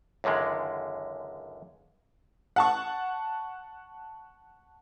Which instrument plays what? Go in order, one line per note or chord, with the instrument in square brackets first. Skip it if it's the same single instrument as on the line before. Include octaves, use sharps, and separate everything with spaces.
[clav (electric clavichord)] C#2 F#2 D3 D#3 G#3
[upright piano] F#5 A5 C#6